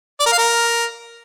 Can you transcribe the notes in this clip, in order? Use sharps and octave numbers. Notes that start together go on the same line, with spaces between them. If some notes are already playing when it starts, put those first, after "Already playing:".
D5
A#4
F5
A#4